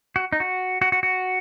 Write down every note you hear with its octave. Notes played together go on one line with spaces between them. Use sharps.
F#4
D#4
F#4
F#4
F#4
F#4